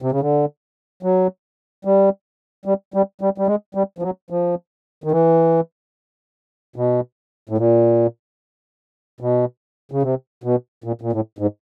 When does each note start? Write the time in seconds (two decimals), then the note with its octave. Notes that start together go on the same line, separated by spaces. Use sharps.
0.02 C3
0.12 C#3
0.21 D3
1.03 F#3
1.85 G3
2.66 G3
2.94 G3
3.21 G3
3.38 G3
3.47 G#3
3.75 G3
3.98 F3
4.02 F#3
4.30 F3
5.04 D#3
5.11 E3
6.76 B2
7.49 A2
7.58 A#2
9.21 B2
9.92 C#3
10.03 C3
10.44 B2
10.84 A#2
11.02 A#2
11.12 A2
11.39 G#2